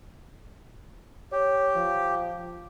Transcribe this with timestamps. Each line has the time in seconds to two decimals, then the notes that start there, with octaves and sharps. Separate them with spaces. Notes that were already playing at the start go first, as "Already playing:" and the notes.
1.32 G4 C#5
1.76 F3